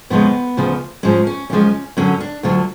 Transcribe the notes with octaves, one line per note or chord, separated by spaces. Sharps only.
F2 C#3 F3 G#3 B3
D2 C#3 F3
G#2 F3 G#3 C#4
C#4
F#2 C#3 F3 G#3 C#4
F#2 D3 F#3 C#4
D4
D2 D3 F#3 F4